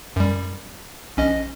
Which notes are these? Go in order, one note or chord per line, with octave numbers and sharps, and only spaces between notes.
F#2 G3
A#1 C#4 D#5